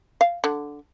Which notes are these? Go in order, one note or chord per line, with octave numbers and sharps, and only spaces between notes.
F5
D3